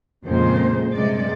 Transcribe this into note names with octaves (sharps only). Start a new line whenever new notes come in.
F2 A#2 C#3 G#3 C5
G2 C3 G#3 D5